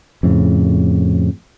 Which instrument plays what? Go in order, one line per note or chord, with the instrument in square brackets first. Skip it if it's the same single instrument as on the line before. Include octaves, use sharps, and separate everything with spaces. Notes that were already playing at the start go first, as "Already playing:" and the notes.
[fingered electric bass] F2 A2 C#3